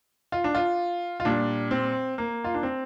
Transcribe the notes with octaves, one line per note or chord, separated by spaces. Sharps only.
F4
D4
F4
F4
A#2 G3 D4
C4
A#3
F4
D4
C4